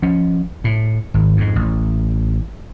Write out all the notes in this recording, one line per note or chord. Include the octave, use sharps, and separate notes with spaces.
F3 C#4
A2
G#1
F2 G#2
A1